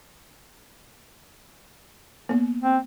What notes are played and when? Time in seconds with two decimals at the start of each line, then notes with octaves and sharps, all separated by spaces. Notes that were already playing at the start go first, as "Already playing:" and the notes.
2.29 A#3 B3
2.62 C4